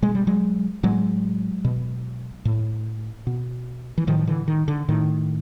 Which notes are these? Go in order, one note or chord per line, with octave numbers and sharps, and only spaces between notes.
B2 G#3
G3
F#3 G#3
A2 F#3 G#3
B2
A2
B2
E3
A2 D#3 F3
F3
D3 E3
D#3
D3
A2 D#3